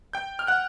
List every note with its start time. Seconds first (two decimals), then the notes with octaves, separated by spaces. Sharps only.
0.13 G5 G6
0.39 F6
0.47 F#5 F#6